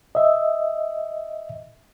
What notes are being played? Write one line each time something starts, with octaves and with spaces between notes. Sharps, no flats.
D#5 E5